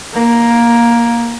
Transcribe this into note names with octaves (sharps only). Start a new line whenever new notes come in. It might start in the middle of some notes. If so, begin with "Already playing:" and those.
A#3